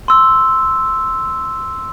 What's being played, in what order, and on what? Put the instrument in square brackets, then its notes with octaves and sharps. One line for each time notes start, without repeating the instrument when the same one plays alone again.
[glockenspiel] C6 E6